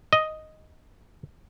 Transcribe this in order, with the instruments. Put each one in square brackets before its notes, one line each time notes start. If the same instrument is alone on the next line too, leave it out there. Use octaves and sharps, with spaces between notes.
[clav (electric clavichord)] D#5